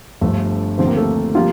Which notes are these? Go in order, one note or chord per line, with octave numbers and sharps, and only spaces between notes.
G1 G2 F3 A3
D#2 D3 F3 A3 C4 C5
A#3 A#4
A3 A4
C3 F3 G3 A#3 F4